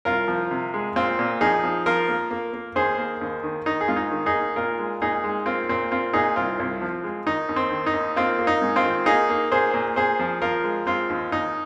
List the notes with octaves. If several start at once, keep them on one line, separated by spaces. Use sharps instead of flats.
C2 F4 A#4
F3
C3
G#3
A#2 C4 F4
A#2
F3 D#4 G#4
F3
F3 F4 A#4
A#3
A#3
A#3
D#2 G#4 C5
A#3
D#2
D#3
D#3 D#4
G#4
G#2 F4
D#4
D#3
D#4 G#4
A#3
A#2 F4 A#4
G#3
A#2 D#4 G#4
G#3
A#3 C4 F4
A#2 C4
A#3 C4 F4
A#2 D#4 G#4
C2 C4 F4
C2
F3
G#3
D#3 D#4
D#2
C4
D#3
D#4
D#2
A#3 C4 F4
A#3
D#4
G#2
C4 F4
D#3
A#3 D#4 G#4
A#3
A#2 G#4 C5
A#2
A#2 G#4 C5
F3
F3 F4 A#4
G#3
G#3 C4 F4
D#2
D#2 D#4